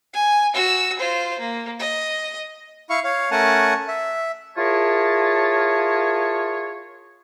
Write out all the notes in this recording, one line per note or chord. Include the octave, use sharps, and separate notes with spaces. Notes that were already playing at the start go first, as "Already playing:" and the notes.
G#5
F#4 E6
F4 C5
A#3
D#5
E4 F5 C#6
C#5 F5
A3 C#4 A#4 F#5 G#5 A5
E5
E4 F4 G#4 A#4 C#5 A5